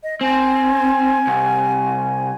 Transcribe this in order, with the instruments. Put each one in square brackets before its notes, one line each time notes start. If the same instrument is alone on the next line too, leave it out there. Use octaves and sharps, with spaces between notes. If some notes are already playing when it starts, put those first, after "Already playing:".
[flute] D#5
[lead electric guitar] C4 [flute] G#5
[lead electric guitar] C2